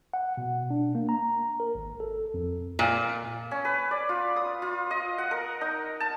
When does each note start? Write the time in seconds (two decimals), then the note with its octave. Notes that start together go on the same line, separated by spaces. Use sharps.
0.13 F#5
0.37 B2
0.70 D4
0.95 A#3
1.09 A#5
1.60 A#4
1.75 G#1
2.00 A4
2.34 F2
2.79 A#2
3.51 C#4
3.65 B4
3.91 D5
4.09 F4
4.36 D#6
4.62 F4
4.91 D#5
5.18 F#5
5.31 A#4
5.61 D#4
6.00 A5